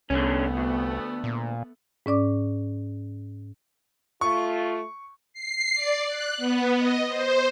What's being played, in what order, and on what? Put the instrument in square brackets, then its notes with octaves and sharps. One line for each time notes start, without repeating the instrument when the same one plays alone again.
[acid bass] C2 [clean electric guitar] D3 C#4 [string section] A3 B3
[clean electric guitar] D2
[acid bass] A#2
[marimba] G#2 C#4 D5 D6
[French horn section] A3 F4 [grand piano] C#6
[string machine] C7
D5
F#6
B3
D#5
C5